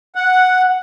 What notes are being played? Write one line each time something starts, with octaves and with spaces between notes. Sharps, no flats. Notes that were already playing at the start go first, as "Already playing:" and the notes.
F#5